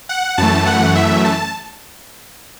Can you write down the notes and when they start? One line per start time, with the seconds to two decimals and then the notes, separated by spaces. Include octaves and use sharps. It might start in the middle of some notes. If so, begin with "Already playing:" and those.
0.09 F#5
0.38 F#2 E3 A3 A5
0.66 F#5
0.95 E5
1.25 A5